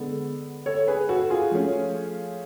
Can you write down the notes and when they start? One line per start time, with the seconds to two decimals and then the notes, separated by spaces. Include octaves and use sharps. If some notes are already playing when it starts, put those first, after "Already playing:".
Already playing: D3 G#3 B3 A4
0.66 A4 C#5
0.88 G#4 B4
1.09 F#4 A4
1.30 F4 G#4
1.51 F3 A3 C#4